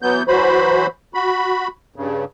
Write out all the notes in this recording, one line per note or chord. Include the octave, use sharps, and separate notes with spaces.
E3 F#3 B3 G6
E3 F#3 F#4 C5 B5
F#4 B5
G2 C#3